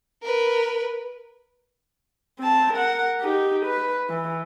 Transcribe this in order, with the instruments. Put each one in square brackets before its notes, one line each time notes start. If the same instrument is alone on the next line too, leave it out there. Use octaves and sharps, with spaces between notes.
[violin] A#4 B4
[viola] C4 A5
A#4 F#5
D#4 G4
B4
E3